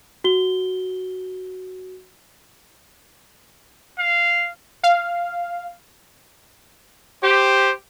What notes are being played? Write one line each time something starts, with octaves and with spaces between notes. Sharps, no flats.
F#4 G7
F5
F5
G4 C5